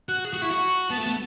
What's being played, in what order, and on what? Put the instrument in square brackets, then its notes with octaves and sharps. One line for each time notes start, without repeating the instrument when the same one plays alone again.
[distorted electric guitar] F#4 [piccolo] F#6
[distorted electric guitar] G#4
F#4
[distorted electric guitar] E4 [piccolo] C#6
[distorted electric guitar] F#4
[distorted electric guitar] B3 [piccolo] A5
[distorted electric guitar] A3
B3